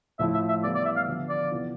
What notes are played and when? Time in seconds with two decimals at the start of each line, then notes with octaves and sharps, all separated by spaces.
0.19 A2 F3 A3 E4 E5
0.34 E5
0.49 E5
0.63 E3 G3 B3 D5
0.75 D5
0.85 E5
0.96 F5
1.07 D3 F3 B3 F4
1.29 D5
1.51 C3 E3 B3 F4